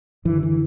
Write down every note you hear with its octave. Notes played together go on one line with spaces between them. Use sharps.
F#2 D3 E3
E3